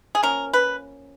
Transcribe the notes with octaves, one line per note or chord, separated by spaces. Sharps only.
G#4
F3 A#3 C#4 A#4
B4